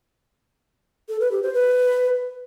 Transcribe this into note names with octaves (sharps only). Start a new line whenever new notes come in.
A4
B4
G4
C5
B4